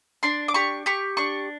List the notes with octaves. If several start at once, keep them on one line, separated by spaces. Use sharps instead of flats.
D4 C6
D6
G4 C#6
G4 C#6
D4 C#6